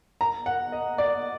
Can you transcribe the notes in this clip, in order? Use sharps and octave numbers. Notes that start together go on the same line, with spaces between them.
A#5
F#5
D#5
D5